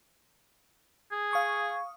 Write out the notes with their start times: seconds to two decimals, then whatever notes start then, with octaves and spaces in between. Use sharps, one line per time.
1.11 G#4
1.31 F5 C#6 D#6